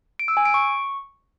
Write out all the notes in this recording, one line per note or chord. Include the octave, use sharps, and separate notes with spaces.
D7
E6
G#5
D7
C#6